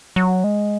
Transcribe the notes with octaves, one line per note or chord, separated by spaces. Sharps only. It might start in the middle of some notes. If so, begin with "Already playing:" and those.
F#3
G#3